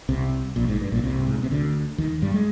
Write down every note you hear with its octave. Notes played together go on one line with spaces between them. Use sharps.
C2 C3
A#1 A#2
G#1 G#2
G2
A#1 A#2
C2 C3
G2
G#2
A#2
C3
D2 D3
D#2 D#3
G2 G3
G#3